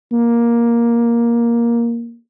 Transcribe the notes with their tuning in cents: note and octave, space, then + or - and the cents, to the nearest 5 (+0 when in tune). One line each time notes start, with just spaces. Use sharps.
A#3 +10